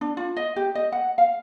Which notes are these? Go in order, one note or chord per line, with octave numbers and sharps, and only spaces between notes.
D4
F4
D#5
G4
D#5
F#5
F5